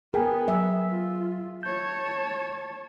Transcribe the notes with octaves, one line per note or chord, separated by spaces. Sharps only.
B3 G#4 A#4 G5 G#5
F#3 E5
F4
C#5 A5 G6